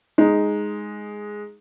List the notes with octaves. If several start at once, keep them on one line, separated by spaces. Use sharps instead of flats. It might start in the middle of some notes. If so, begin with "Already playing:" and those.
G#3 D#4